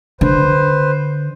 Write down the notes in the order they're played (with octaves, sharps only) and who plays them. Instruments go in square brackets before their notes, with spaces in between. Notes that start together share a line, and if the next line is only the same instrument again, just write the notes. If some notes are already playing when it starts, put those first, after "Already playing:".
[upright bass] D3 [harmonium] B4 C5